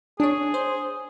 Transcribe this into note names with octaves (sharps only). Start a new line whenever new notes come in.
D4 G#4 C#5
C5